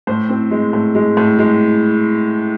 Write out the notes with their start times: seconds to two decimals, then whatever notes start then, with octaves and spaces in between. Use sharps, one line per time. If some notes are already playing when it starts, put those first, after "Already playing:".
0.07 A2 C5
0.29 C4
0.51 G#3
0.73 A2
0.95 G#3
1.17 A2
1.39 G#3